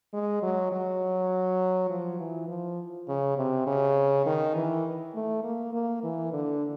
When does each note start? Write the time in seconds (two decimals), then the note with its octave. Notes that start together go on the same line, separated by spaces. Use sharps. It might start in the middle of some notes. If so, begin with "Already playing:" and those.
0.13 G#3
0.42 F#3
0.72 F#3
1.90 F3
2.20 E3
2.48 F3
3.08 C#3
3.37 C3
3.67 C#3
4.26 D#3
4.55 E3
5.15 A3
5.44 A#3
5.73 A#3
6.03 E3
6.33 D3